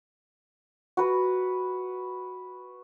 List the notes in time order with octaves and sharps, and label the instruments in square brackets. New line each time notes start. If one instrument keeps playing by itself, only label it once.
[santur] F#4 B4